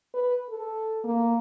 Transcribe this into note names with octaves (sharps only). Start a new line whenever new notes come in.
B4
A4
A#3